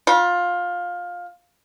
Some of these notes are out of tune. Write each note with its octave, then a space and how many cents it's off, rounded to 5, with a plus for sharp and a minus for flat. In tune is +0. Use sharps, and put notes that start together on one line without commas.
F4 +15 B5 -30